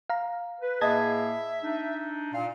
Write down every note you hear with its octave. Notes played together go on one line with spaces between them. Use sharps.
F5 A#5
B4
A2 A#3 G#4 D#5 E5 A5 G#6
D4 D#4
A#2 F5